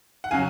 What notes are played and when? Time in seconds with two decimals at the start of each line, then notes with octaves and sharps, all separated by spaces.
0.24 F#5
0.31 C#3 F#3 C#4 F5 G#5